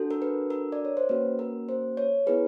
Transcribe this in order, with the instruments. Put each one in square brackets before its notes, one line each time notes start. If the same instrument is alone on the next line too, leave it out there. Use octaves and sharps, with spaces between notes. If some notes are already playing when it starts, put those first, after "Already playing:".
Already playing: [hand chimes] D4 F#4 A4
A#4
B4
A#4
D5
C#5
C5
A#3 C#4 F#4 B4
A#4
C5
C#5
B3 E4 G#4 B4